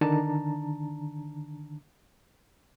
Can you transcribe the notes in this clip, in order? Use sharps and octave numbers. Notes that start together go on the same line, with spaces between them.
D3 D#3 D4 A5 A#5